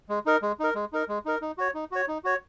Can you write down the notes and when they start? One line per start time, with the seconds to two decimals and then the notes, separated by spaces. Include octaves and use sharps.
0.09 G#3
0.26 D#4 A#4
0.42 G#3
0.60 D#4 A#4
0.75 G#3
0.93 D#4 A#4
1.09 G#3
1.25 D#4 A#4
1.42 D#4
1.58 F#4 C#5
1.74 D#4
1.92 F#4 C#5
2.08 D#4
2.24 F#4 C#5